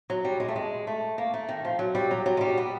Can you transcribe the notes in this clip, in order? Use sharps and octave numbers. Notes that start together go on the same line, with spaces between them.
F#3
G3
G#3
A3
G#3
A3
A#3
A3
D#3
F3
F#3
G3
F#3
F#3
G#3
G3
B3